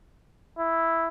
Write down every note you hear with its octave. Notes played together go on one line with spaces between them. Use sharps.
E4